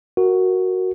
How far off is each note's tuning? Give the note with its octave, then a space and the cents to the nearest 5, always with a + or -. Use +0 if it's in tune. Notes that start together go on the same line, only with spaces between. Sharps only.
F#4 +0 A#4 +0